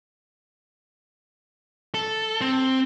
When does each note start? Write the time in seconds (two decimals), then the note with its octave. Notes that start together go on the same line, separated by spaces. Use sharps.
1.94 A4
2.41 C4